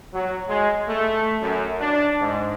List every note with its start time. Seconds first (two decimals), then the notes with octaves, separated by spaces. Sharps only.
0.14 F#3
0.49 G#3
0.88 A3
1.42 F#2
1.80 D4
2.21 G#2